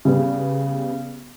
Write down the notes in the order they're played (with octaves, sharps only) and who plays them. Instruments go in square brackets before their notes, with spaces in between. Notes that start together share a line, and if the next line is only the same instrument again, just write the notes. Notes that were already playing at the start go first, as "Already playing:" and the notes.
[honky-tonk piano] C#3 G3 B3